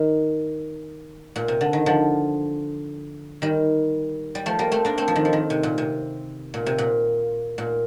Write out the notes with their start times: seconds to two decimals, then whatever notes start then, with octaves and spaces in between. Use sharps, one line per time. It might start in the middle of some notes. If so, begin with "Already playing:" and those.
Already playing: D#3
1.36 A#2
1.48 C3
1.61 D3
1.73 D#3
1.86 D3 F3
3.42 D#3 G3
4.35 G3
4.46 F3 A3
4.59 G3 A#3
4.72 A3 C4
4.85 A#3 D4
4.98 A3 C4
5.08 F3
5.15 D#3
5.25 F3
5.33 D#3
5.50 C3
5.63 A#2
5.78 C3
6.54 A#2
6.66 C3
6.78 A#2
7.58 A#2